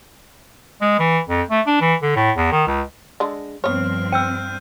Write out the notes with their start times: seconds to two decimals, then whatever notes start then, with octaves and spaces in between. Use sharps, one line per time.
0.81 G#3
0.99 E3
1.29 F2
1.50 A3
1.67 D4
1.81 E3
2.02 D3
2.16 A2
2.37 E2
2.52 D#3
2.67 C#2
3.20 D3 G#3
3.64 G2 F3 B3 C4 C#5 F6
4.12 G5 E6 F6 G6 D#7